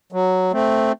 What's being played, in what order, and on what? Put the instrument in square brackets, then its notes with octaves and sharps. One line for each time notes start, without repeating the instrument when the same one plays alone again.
[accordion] F#3
A3 C4